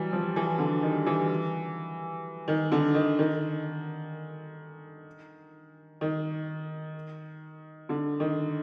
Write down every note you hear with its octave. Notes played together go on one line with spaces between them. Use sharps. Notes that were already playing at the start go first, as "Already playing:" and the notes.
Already playing: E3 F#3 G3
F3
E3
D3
D#3
E3
D#3
D3
D#3
D#3
D#3
D3
D#3